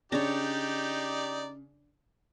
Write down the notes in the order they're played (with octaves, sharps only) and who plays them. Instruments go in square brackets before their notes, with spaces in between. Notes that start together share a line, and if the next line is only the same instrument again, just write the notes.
[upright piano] C#3 [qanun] D4 C#5 [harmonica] D#4 G4 D5